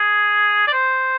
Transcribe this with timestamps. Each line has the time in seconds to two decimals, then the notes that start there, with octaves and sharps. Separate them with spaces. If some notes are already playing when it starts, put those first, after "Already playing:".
Already playing: G#4
0.68 D5
0.73 C5